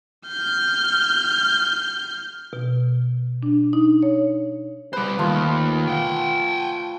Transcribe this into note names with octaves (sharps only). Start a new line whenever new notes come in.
F6 G6
B2
D4
D#4
C#5
G3 B4 C5 D5
D#2 F3 A3 F4
F#5 G5